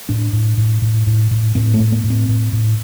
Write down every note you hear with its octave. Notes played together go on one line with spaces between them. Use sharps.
A2 D4
A2
A2
A2
A2
A2
A2 C4
A3
A2
A#3
A2
C4
A2
A2